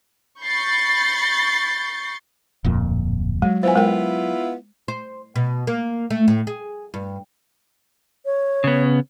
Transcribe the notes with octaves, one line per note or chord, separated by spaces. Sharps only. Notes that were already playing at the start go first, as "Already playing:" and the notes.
B5 C#6 G6 A6 C7
D1 F2 A#2
F#3 G#3
B3 E4 F4 C5 G#5
G#3 A#4 G5
C5
B2
A#3
A3
A2
G#4
G2
C#5
C#3 B3